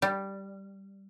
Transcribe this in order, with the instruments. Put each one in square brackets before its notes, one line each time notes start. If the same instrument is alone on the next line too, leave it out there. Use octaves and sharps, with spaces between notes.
[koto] G3